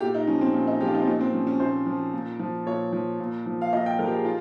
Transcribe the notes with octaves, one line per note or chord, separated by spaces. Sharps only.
A#2 G4
D#4
F3 C#4
C4
A#2 C#4
D#4
F3 G4
F4
D#4
C4
A#2 C#4
C4
F3 C#4
C#4
A#2 C5
F3
A#2
F3
A#2 C#5
F3
A#2
F3
F5
A#2 D#5
G5
F3 A#4
G4
G#4
F4